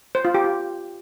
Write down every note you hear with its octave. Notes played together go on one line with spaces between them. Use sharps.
C5
F4
G4
F4